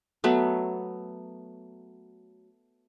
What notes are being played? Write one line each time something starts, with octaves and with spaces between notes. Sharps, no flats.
F#3 A3 B3